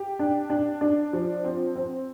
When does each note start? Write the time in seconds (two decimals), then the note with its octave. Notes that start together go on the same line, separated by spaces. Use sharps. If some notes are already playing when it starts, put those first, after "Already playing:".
Already playing: G4
0.19 D4
0.50 D4
0.81 D4
1.13 F3
1.45 C4
1.76 C4